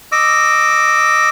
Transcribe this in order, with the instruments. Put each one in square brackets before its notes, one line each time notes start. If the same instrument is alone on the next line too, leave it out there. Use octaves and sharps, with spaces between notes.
[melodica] D#5 D6 E6